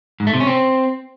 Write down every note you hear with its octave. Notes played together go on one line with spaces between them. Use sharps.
G#2
A3
C3
C#4
C4